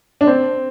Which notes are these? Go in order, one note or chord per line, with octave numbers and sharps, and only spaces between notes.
D4
C4